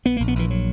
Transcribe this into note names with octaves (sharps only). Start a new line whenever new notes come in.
A#1 B3
A#1 A#3
B3
A#1 E3
F#3